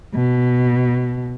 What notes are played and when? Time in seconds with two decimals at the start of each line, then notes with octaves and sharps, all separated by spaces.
0.15 B2